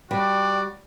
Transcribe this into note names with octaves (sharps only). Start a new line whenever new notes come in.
G3 F#4 D5 G5